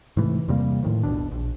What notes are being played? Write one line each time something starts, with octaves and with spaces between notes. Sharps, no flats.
G#2 C3 E3 A3
E2 C3 G3 A#3
A2 D#3 F3
E1 B1 B2 D4
A#1